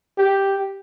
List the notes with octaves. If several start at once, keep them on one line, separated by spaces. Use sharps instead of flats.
G4